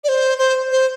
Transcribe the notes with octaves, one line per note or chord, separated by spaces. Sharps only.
D5
C5
C5
C5